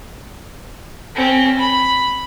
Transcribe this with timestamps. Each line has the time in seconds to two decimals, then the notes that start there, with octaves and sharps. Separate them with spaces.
1.15 C4 C#4
1.59 B5